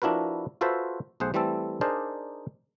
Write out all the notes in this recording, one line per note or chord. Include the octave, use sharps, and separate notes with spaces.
F3 D4 E4 F#4 A#4 B4
F4 F#4 A4 B4 C5 E5
B1 A3 G#4 C5 F#5
E3 G3 A3 C4 A4
D4 D#4 G#4 A#4 C5 D5